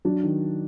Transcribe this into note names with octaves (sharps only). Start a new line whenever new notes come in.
F#3 D4
D#3